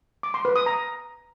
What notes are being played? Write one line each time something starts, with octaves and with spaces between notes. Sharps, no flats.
D6
C6
B4
D#6
A#5